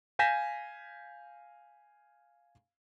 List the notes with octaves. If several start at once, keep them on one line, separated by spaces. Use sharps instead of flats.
F5 G#5 G6 A#6 B6 E7